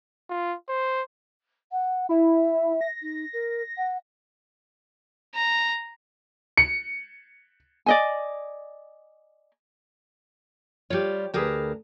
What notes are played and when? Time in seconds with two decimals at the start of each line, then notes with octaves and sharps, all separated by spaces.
0.30 F4
0.69 C5
1.72 F#5
2.09 E4 E5
2.81 A#6
3.01 D#4
3.33 A#4
3.77 F#5
5.34 A#5
6.57 C#7
7.86 D5 D#5 G#5
10.90 G3 F4 G4 C#5
11.34 D2 G4 G#4 A#4 B4 A5